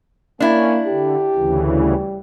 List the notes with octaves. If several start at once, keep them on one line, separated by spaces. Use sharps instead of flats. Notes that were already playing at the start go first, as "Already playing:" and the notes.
A#3 C#4 D4 E4
D3 G4
D2 C#3 E3
G3